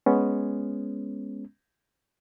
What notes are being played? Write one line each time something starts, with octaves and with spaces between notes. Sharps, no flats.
G#3 B3 C#4